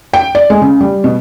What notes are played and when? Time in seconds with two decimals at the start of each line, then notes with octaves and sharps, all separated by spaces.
0.13 G5
0.35 D5
0.50 G#3
0.61 C#3
0.81 G3
1.04 B2